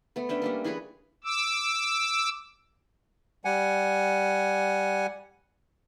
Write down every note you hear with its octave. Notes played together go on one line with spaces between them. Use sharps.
A3 B3
C#4 D4 E5 G5
G3 A3 A#3
E3 G#4 B4 C#5
D6 E6
G3 F#5 G#5